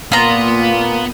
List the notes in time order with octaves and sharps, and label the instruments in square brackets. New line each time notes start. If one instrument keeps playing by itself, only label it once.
[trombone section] A#2 [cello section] A#3 [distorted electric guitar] B3 [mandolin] F4 A#5